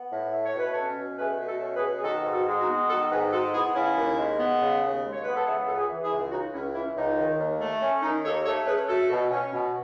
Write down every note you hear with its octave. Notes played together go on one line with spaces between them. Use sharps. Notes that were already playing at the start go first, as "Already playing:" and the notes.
Already playing: B3
A2
A3
C#5
B2
B4
C#4 A4 C#5
B2
A3 G#4 B4
B2
F#4 A4
C#4
G#4 B4
B2
G#4
D#3 F#4 A4
G#2
F#4 A4
G#3
D#4 F#4
B3
D#3 F#4 A4
G#2 G#4 B4
G#3 F#4 A4
B3 E4 G#4
C#3 C#4 E4
D#2
G#3
B3
C#3
D#2
G#3
C#5
B3 B4
A4
C#3 E4 G#4
C#2 A4
G#4 B4
E3
E4 G#4
C#2
C#3 D#4 F#4
C#2 C#4 E4
E3 C#4 E4
C#2 D#4
D#3
D#2
A3
C#4
D#3 D#4
D#2 A4 C#5
A3 A4 C#5
C#4 G#4 B4
A3 F#4 A4
B2
C#4
B2